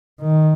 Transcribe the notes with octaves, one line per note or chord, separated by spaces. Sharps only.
D#3